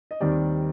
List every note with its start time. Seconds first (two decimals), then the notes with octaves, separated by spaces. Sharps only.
0.11 D#5
0.21 D#2 D#3 G3 C4 D5